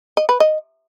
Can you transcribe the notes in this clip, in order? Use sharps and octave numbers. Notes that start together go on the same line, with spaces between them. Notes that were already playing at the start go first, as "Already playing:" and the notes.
D#5
B4
D#5